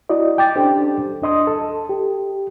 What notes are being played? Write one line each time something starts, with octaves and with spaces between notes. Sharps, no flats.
E4 F#4 D5 D#5
G5 D6 A6
C#4 D4 G4 A4 C5
D#2 D4 D#5 C6 D#6
A4
G4